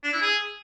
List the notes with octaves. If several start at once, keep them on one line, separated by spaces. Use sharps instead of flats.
D4
E4
G#4